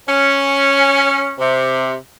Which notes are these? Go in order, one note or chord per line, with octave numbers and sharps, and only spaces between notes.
C#4
C3